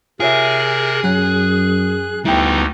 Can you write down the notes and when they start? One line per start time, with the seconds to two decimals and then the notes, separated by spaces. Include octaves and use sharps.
0.20 C3 F4 G#4 A#4 C#5 E5 F#6
1.04 F#2 F#3 F#6
2.25 D2 G3 B3 D#4 E4 G5